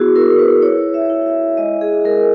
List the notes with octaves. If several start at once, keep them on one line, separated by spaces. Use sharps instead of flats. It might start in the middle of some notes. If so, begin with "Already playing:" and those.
Already playing: B3 E4 F#4 G#4
E4 A#4
B4
E4 C#5
E5
E4
E5
G#3 D#5
G#4
G#3 A#4